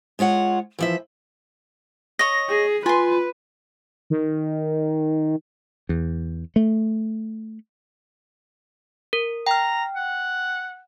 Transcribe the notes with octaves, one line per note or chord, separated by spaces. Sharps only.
G#3 F4 C#5 F#5
E3 F3 E5
C#5 D#5 A#6
G#4
F4 B4 G#5 C6
D#3
E2
A3
A#4
G5 A#5 F6
F#5